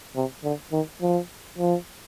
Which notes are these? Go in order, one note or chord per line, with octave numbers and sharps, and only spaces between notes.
C3
D3
D#3
F3
F3